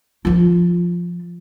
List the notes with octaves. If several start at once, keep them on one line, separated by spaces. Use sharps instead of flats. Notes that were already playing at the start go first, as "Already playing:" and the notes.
F3 F4